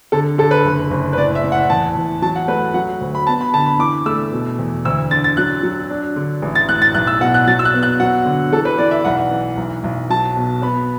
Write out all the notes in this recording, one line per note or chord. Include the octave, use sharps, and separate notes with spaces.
D3 A4
D3 A4
B4
F#1
F#1
B4
A2 D5
E5
A2
F#5
E2 A5
E2
F#3 A5
F#5
A3 B4
F#3 F#5
D2
B5
B3 A5
B5
D3 A5
B5
E3 D6
A3 E6
B2
E2
D2 E6
D3 A6
A6
F#3 F#6
F#3
D4
D3
A1
A6
A2 F#6
A6
B1 F#6
E6
B2 F#5
F#6
F#3 A6
E6
F#6
B3
F#6
F#3 F#5
D3
E3 A4
B4
E3 D5
E5
B1 F#5
E3
B1
B1
F#3 A5
B2
B3 B5